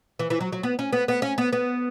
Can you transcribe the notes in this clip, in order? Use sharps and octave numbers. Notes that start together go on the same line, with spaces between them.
E3
E3
F#3
F#3
B3
C#4
B3
B3
C#4
B3
B3